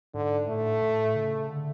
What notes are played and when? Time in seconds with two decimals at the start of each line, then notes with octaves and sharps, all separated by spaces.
0.14 G#2 D3
0.48 A2 A3
0.82 A2
1.16 C#3
1.50 D3